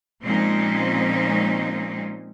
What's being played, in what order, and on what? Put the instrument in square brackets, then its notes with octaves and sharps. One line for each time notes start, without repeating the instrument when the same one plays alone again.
[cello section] A#2 F3 G#3 C4 C#4 D#4